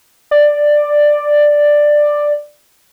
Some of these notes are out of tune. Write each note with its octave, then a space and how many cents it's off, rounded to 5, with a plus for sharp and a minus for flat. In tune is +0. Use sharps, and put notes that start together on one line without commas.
D5 +5